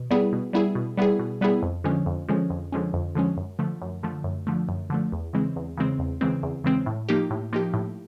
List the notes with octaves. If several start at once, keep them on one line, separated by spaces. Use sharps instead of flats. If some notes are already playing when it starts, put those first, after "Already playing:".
Already playing: B2
G3 B3 E4 G#4
B2
G3 B3 E4 G#4
B2
G3 B3 E4 G#4
B2
G3 B3 E4 G#4
F2
D3 F3 G#3 C#4
F2
D3 F3 G#3 C#4
F2
D3 F3 G#3 C#4
F2
D3 F3 G#3 C#4
F#2
D3 F3 A3
F#2
D3 F3 A3
F#2
D3 F3 A3
F#2
D3 F3 A3
E2
C#3 E3 G#3 C4
E2
C#3 E3 G#3 C4
E2
C#3 E3 G#3 C4
E2
C#3 E3 G#3 C4
A2
F3 A#3 D#4 G4
A2
F3 A#3 D#4 G4
A2